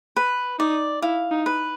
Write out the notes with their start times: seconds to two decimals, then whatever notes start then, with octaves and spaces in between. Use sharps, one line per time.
0.16 B4
0.59 D#4 D5
1.02 E4 F5
1.31 D#4
1.46 B4